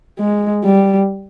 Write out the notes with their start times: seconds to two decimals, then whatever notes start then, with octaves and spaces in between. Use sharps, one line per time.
0.19 G#3
0.65 G3